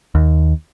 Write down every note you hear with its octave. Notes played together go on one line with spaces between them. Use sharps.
D#2